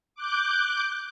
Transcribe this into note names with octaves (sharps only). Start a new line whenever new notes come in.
D6 F#6 G6